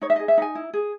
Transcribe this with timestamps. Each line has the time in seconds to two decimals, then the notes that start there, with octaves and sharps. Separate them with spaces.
0.02 D#4 C#5
0.10 E5
0.16 G#4 D#5
0.28 E5
0.38 D#4 G#5
0.55 E4
0.73 G#4